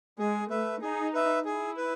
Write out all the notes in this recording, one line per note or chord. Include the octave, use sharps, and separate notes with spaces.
G#3 G#4
A3 B4 E5
D#4 G#4
B4 E5
E4 G#4
B4